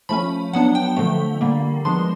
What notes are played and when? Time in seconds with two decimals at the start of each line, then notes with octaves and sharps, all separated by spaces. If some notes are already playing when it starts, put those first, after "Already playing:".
0.09 F3 A3 C#4 B5
0.53 F#3 B3 D4 F#5
0.75 G5
0.97 D3 F3 A3
1.41 D3 G3 A#3
1.85 F3 G#3 B3 D4 C6